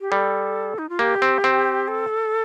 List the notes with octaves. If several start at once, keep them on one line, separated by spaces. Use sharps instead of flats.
G4
G3 A4
D#4
F4
A#3 G4
C4
C4
A4